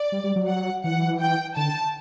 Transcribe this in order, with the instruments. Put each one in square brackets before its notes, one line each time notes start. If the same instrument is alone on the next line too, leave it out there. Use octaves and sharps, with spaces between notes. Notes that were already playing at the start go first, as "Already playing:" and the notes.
Already playing: [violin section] D5
[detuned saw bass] G3
G3
F#3
[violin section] F#5
[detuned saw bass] E3 [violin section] F#5
[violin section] G5
[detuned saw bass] D3 [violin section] A5